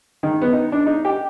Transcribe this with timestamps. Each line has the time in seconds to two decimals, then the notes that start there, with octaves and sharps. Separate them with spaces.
0.23 D#3
0.42 B3
0.53 D#4
0.72 D4
0.86 D#4
1.05 G4